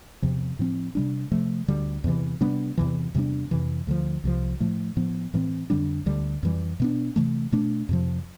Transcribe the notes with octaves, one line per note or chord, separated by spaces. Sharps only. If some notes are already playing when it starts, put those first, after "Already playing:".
E2 C3 F3
A2 F3 C4
C3 G3 D4
C3 F3 A3
D2 D3 G3
E2 C3 E3
C3 G3 B3 D4
E2 C3 E3
E2 C3 G3 D4
F2 C3 E3
D2 D3 F3
C2 C3 F3
A2 F3 A3
A2 F3 B3
A2 E3 A3 C4
F2 D3 G3 D4
D2 D3 G3
F2 E3 G3
B2 B3 D4
C3 E3 A3
B2 A3 D4
F2 C3 F3